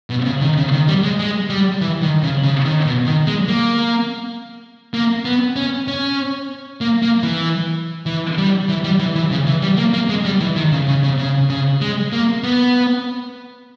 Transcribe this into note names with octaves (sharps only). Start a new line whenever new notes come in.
B2
C#3
D#3
C#3
D#3
G3
G#3
G#3
G3
E3
D#3
C#3
C#3
D#3
B2
D#3
G#3
A#3
A#3
B3
C#4
C#4
A#3
A#3
E3
E3
G3
E3
G3
E3
E3
C#3
E3
G3
A#3
A#3
G#3
G3
E3
D#3
C#3
C#3
C#3
C#3
C#3
G#3
A#3
B3